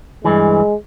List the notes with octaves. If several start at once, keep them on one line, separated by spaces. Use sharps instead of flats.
G2 E3 G#3